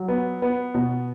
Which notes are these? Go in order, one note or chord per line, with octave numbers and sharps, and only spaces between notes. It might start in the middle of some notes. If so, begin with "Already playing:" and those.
Already playing: F#3
B3
B3
B2